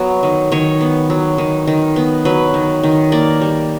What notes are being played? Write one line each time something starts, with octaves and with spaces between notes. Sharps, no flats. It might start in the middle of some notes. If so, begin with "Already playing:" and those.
Already playing: F#3 B3
D#3
D#3 C#5
B3
F#3
D#3
D#3
B3
F#3 B4
D#3
D#3
A#3 D5
G3